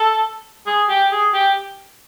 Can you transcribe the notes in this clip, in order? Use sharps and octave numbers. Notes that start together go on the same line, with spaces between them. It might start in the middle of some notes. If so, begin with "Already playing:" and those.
Already playing: A4
G#4
G4
G#4
G4